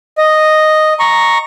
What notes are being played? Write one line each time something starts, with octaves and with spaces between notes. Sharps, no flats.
D#5
A#5 C#6